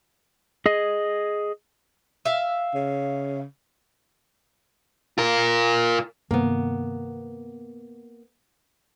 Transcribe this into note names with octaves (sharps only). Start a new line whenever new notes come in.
G#4 D#5
E5 F5
C#3
F4 A#4
G2 C3 D#3 A#3 B3